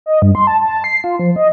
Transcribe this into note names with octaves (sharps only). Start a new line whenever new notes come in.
D#5
G2
C6
A5
A5
C7
F4
F3
D#5